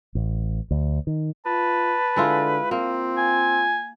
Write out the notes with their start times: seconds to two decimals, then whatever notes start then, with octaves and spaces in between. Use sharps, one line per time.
0.15 A1
0.71 D2
1.07 D#3
1.46 F4 B4 A5
2.16 D3 G#3 E4 F4
2.71 A#3 C4 F4
3.18 G#5